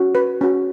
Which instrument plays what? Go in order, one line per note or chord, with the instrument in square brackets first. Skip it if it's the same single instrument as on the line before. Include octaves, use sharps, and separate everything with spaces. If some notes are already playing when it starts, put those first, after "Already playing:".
Already playing: [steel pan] C#4 F#4
B4
C#4 F#4